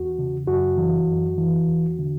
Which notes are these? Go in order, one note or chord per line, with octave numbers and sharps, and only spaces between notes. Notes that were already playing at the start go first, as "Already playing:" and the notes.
Already playing: E2 F#4
C#3
F#2 F#4
E3
F#2
E3
E2
D3